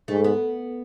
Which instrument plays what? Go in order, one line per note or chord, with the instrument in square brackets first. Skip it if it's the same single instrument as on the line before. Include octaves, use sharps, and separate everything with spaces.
[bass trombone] G#2 [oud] A3
[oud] B3